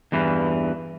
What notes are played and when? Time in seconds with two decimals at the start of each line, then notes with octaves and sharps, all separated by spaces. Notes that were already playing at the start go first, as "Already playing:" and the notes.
0.12 E2 G2 E3